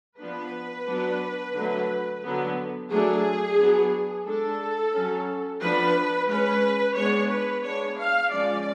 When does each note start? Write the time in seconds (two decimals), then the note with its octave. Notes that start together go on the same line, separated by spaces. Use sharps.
0.19 F3 B3 D4 B4
0.86 F#3 B3 D4
1.54 D3 F#3 A3
2.23 D3 F#3 B3
2.90 F#3 A3 D4 G#4
3.58 F#3 B3 D4
4.25 G#3 D4 A4
4.93 F#3 C#4
5.60 F3 B3 D4 B4
6.28 G#3 C#4 B4
6.96 G#3 B3 D4 C#5
7.30 B4
7.63 G#3 B3 D4 C#5
7.98 F5
8.31 F3 G#3 C#4 D5